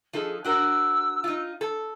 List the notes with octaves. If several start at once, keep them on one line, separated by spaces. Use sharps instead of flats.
F3 D#4 G#4 A4
D4 F#4 A#4 E6
D#4 F4
A4